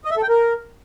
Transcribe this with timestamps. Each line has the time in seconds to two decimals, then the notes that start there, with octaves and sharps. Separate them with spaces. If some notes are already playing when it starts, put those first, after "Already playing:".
0.05 D#5
0.11 E5
0.17 A4
0.23 G5
0.29 A#4